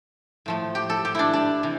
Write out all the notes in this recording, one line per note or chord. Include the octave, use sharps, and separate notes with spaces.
A2 F3 A3
G4
A4
G4
D4 E4
D4
C3 E3